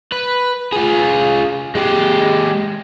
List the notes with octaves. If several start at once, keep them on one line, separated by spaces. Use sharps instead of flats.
B4
F4 G#4
G#3 G4